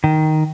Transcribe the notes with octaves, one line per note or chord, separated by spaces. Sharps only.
D#3